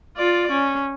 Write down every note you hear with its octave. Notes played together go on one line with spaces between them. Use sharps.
F4 D5
C#4